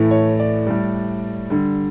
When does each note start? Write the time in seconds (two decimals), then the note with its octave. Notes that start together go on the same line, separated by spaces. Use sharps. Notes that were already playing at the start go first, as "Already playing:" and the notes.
Already playing: A2 E3 A3
0.11 C#5
0.40 D5
0.67 A2 G3
1.50 D3 G3